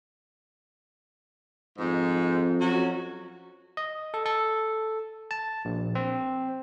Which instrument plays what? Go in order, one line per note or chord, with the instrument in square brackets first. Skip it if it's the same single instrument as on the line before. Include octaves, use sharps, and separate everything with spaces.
[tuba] F2 [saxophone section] G#2
[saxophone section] F#3 C#4 F#4
[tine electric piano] D#5
A4
A4
A5
A#1
C4